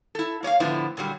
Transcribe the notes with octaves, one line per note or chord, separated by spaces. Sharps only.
E4 A4
A#3 C#5 D#5 F5
A2 D3 F3 B3 E4
A#2 D3 F#3 G3